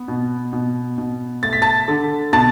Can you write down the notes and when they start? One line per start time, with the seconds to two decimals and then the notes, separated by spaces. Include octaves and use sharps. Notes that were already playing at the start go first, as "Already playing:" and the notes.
Already playing: B3
0.08 B2
0.53 B2
0.98 B2
1.43 A3 A6
1.53 B6
1.62 A5 A6
1.88 D3
2.33 B2 A5 A6